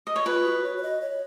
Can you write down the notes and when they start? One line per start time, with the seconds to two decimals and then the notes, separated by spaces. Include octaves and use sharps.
0.07 D#5
0.16 C#5
0.25 F4 B4
0.45 F#4
0.63 C#5
0.77 C#5
0.83 D#5
1.01 C#5